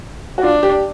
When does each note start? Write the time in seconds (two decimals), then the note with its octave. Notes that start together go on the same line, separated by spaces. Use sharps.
0.38 F#4
0.43 D4 F4
0.63 G4